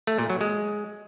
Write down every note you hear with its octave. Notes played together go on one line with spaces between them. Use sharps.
A3
A#2
F#3
G#3